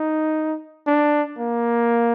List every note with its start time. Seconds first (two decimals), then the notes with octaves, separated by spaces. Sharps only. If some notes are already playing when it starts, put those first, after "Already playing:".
Already playing: D#4
0.87 D4
1.39 A#3